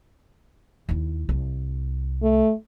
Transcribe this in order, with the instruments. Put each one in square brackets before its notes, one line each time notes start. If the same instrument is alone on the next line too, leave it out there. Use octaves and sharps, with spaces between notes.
[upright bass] D#2 E4
C2
[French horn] A3